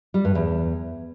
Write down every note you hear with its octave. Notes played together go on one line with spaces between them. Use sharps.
G3
G2
E2